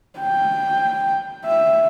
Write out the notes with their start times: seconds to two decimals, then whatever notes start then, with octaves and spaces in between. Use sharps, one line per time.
0.19 G5
1.45 E5